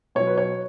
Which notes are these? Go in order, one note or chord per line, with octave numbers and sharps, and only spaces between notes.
B2 F#3 C#5
B4
C#5